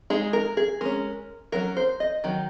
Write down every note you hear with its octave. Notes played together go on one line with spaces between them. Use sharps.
G#3 D#4 G#4
A#4
G#4
G#3 C#4 A#4
F#3 C#4 A#4
C5
D#5
D#3 F#3